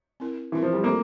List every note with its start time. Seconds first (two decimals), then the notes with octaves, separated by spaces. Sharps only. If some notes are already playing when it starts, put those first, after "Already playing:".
0.20 C4 E4 A#4
0.52 E3 C4 E4 A#4
0.63 F3
0.73 G3
0.84 A3 A#3 C4 F4 A4